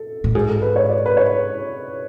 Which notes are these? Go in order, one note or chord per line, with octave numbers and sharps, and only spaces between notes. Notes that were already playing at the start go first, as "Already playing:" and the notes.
Already playing: A4
A2
G#2 G#4
A4
B4
C#5
D5
B4
C#5